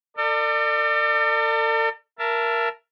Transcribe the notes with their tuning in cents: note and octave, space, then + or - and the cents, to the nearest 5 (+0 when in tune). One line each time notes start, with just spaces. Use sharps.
A4 +45 D5 +25
A#4 +5 E5 +30 A5 +0